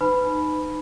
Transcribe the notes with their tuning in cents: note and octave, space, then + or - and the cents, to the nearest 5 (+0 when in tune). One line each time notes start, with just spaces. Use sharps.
D#4 -20 B4 +30 B5 +0